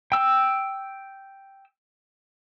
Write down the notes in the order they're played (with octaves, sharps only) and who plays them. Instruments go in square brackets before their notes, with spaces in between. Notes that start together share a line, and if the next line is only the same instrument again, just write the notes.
[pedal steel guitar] G5 E6